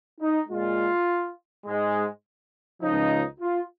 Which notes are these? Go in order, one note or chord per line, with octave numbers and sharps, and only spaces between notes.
D#4
A#2 G#3 F4
G#2 G#3
C#2 C#3 F3 D#4
F4